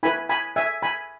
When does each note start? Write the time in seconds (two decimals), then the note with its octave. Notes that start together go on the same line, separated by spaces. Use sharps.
0.03 E4 B4 G#5 B5
0.29 G#5 B5
0.56 E5 G#5
0.82 G#5 B5